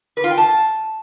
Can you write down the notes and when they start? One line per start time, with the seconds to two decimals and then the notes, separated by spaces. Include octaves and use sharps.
0.17 B4
0.24 F4
0.31 G5
0.38 A5